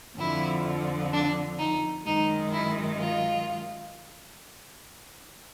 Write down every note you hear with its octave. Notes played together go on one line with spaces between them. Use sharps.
F2 D3 F3 E4
D4
D#4
F#2 D#3 G#3 D#4
E4
F4